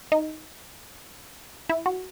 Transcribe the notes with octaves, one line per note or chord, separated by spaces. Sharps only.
D#4
E4
F#4